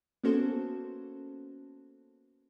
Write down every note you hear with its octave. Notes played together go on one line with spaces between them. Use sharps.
A#3 B3 C#4 F#4 A4 C5